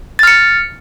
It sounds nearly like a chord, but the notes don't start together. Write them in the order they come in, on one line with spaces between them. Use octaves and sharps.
A6 F6 C#7